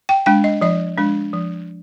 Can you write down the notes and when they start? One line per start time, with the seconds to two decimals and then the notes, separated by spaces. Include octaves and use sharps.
0.09 G5
0.26 G#3 D4 G5
0.44 D#5
0.61 F3 D#5
0.98 G#3 D4
1.33 F3